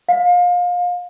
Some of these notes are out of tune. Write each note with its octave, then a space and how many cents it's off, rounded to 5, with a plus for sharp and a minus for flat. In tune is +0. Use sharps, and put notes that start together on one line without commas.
F5 +30